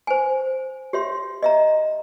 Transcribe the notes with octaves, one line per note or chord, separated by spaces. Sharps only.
C5 G#5
G4 C#5 E5 C6
D#5 E5 A#5